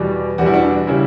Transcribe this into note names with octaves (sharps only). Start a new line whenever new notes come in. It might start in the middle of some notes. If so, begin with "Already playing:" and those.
Already playing: E2 B2 G3
E2 B2 G3 F#4
E4
D4 F#4
C#3 G3 C#4 E4